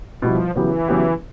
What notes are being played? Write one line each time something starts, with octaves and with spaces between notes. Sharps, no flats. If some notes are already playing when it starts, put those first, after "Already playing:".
B2 F3 G3 B3 E4
C#3 E3 F#3 B3 E4 G4
C#3 F#3 B3 E4 G4